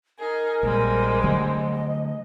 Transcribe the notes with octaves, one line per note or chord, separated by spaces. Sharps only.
D#4 G#4 A#4
A#1 G3 G#3 C4
D3 F#3 A3 D#5